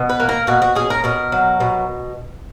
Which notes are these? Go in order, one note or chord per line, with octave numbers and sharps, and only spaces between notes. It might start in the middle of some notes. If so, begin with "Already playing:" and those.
Already playing: B2
B4
A#3
A#4
B2 F#4
F#4
C#4 G#4
A#4
B2 A#4
F#3
B2